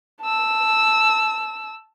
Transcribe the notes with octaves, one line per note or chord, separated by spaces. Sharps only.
A5 E6